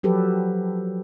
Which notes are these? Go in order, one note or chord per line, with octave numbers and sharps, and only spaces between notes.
F3 F#3 G4 A4 B4